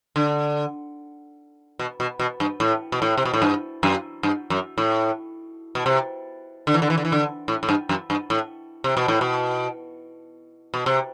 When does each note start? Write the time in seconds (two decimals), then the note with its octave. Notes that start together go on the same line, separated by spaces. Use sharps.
0.16 D3
1.79 B2
2.00 B2
2.19 B2
2.40 G2
2.60 A2
2.92 B2
3.02 A2
3.18 C3
3.25 B2
3.34 A2
3.42 G2
3.83 F#2
4.23 G2
4.50 F#2
4.78 A2
5.75 B2
5.86 C3
6.67 D3
6.74 E3
6.82 D3
6.90 E3
6.98 D3
7.05 E3
7.12 D3
7.48 A2
7.63 A2
7.69 G2
7.89 F#2
8.10 G2
8.30 A2
8.84 C3
8.97 B2
9.08 A2
9.21 B2
10.74 B2
10.86 C3